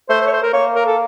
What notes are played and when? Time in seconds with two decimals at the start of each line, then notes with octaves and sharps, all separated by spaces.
0.09 A3 C5
0.21 C5
0.26 C#5
0.32 C5
0.42 A#4
0.53 A#3 C#5
0.75 A#4
0.86 A4